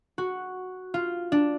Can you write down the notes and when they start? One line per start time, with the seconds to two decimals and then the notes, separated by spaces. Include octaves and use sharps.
0.18 F#4
0.94 F4
1.32 D4